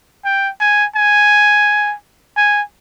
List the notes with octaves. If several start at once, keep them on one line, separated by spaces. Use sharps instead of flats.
G5
G#5
G#5
G#5